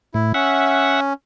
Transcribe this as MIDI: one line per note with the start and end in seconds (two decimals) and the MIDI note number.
0.14 0.33 45
0.14 0.32 64
0.34 1.13 61
0.34 1.00 76
0.34 1.00 78